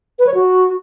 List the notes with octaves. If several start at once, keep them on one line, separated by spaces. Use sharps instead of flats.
B4
C#5
F#4